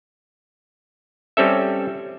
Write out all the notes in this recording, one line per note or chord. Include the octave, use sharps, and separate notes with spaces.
G3 C4 C#4 A4 E5